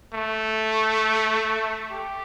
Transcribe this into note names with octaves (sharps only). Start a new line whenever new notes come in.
A3
G4